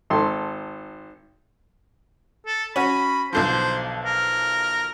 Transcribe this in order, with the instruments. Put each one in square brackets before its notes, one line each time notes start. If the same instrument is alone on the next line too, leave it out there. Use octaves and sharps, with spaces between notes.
[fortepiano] G#1 A4 C6
[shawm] A4
[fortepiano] C#4 F#4 [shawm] B5
[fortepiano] B1 D3 F3 [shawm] C5
[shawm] A#4